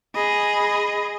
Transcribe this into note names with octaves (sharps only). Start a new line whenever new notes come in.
G#4 D#5 B5